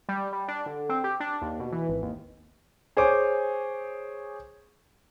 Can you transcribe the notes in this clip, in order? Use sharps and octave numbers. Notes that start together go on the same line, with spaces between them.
G3
G3
D4
D3
C4
G4
D4
D#2
B2
E3
G#1
D#2
G#4 C5 C#5 G#5 D6